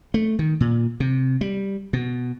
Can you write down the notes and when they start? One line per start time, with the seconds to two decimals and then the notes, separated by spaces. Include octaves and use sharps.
0.14 A3
0.39 D#3
0.61 A#2
1.00 C3
1.41 G3
1.93 B2